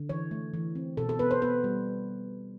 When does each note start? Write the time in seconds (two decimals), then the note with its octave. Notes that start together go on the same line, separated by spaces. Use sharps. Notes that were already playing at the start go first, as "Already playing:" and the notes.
Already playing: D3
0.09 E3 C#5
0.31 A3
0.54 E3
0.75 C4
0.97 B2 A4
1.09 A4
1.19 B3 B4
1.31 C5
1.42 B3 B4
1.64 G3